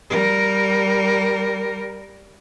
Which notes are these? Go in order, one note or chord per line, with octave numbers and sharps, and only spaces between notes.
G3 A#4